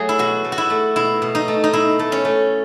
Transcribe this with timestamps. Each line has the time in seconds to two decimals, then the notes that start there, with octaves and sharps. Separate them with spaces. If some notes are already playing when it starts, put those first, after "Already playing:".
Already playing: F#3 A3 G#4
0.09 E4
0.19 B2 F#4
0.44 A3
0.52 F#4
0.58 E4
0.70 A3
0.96 B2 E4
1.22 B2
1.35 D#4
1.48 A3
1.64 D#4
1.73 B2 E4
1.99 A3
2.12 C#4
2.25 A3